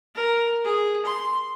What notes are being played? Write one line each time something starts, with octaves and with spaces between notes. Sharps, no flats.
A#4
G#4
C6